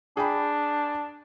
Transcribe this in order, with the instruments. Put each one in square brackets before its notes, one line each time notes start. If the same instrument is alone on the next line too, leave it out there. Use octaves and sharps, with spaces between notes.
[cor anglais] D4 [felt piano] G#4 G5 B5